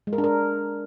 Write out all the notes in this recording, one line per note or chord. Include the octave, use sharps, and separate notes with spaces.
G#3
A#4
D4
A#4